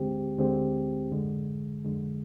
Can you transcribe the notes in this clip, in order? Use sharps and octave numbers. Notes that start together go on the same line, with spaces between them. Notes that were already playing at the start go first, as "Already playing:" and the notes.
Already playing: D2 D3 G#3 C4 G4
D2 D3 G#3 C4 G4
F2 D3 G#3
F2 D3 G#3